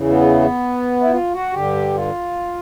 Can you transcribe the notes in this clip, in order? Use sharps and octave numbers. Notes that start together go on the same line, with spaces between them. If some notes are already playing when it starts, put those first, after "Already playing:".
Already playing: E2 C#3 E3
B3
E4
F4
F#4
G2 D3 G4
F4